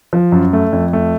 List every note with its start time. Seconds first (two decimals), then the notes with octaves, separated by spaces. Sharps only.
0.13 F3
0.32 F#2
0.53 A3
0.73 F2
0.93 A3